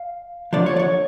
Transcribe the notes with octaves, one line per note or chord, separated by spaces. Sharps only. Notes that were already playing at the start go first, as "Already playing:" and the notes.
Already playing: F5
D2 D3 F3 D5
C#5
D5
C#5